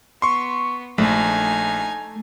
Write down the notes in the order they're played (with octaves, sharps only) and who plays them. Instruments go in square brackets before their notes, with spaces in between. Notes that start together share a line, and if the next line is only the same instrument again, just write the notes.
[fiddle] B3 [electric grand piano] C6 C#6
[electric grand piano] A#1 [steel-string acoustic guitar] A3 [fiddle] D#4 G#5